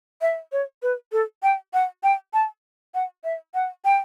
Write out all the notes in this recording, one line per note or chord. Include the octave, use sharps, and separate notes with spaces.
E5
C#5
B4
A4
G5
F#5
G5
A5
F#5
E5
F#5
G5